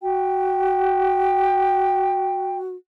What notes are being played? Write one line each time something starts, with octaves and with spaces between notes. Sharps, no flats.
F#4 G5